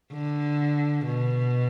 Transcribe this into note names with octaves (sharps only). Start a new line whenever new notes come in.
D3
B2